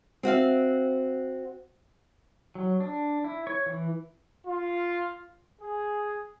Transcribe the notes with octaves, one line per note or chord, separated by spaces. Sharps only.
C4 F#4 E5 F5
F#3
D4
E4
C#5
E3
F4
G#4